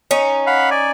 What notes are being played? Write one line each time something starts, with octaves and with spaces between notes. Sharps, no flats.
C#4 D#4
F5 F#5 B5
D5 G#5